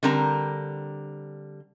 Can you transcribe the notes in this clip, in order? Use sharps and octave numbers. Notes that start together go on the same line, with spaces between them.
D3 G3 C4 A#4 A#5